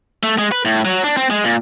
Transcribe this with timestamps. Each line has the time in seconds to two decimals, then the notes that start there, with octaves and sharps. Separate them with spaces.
0.23 A3
0.38 G#3
0.52 B4
0.65 A2
0.85 F#3
1.04 D4
1.17 C4
1.30 G#3
1.44 A#2